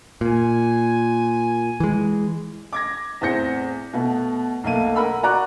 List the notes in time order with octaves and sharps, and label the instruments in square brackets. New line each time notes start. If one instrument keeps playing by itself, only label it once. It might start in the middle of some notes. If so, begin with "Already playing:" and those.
[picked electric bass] A#2 [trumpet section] G#5
[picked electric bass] E3 G#3
[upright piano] D6 G#6 A#6
E2 A2 C4 G6 A#6 C#7
B2 A3 B3
B1 A3 A#3 D#7
A#4 F#5 B5 E6
F#4 D5 A#5 C#6 D6 F#6